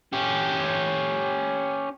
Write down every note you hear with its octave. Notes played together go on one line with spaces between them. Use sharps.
C#4 G4